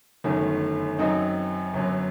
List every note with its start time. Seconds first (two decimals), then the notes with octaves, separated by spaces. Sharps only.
0.24 G1 F#2 D#3 A3
0.99 F#2 F#3 C4 D#4
1.74 G1 F#2 F#3